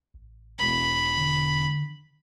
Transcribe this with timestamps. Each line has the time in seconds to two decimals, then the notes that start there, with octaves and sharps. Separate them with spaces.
0.14 A1
0.59 E1 B5
1.17 D3